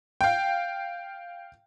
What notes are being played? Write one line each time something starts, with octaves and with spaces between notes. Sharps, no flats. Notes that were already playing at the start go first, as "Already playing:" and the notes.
F5 G5